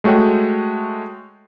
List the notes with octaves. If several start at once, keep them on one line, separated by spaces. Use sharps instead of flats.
G#3 A3 F#4 C#5 G5